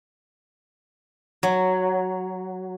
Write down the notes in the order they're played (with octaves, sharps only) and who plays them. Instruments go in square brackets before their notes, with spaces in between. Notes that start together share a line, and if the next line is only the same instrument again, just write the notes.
[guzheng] F#3